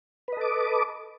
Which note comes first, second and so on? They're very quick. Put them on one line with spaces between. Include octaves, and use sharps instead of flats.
B4 D#5 A4 D6